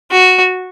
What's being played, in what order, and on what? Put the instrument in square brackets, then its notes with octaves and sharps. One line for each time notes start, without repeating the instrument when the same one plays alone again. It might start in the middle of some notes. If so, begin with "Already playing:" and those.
[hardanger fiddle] F#4